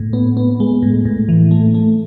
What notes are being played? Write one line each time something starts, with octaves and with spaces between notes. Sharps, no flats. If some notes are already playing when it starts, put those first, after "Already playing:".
Already playing: A2
B3
B3
G#3
A2
A2
E3
A3
A3